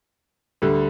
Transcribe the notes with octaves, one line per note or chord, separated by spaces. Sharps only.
D2 D3 G3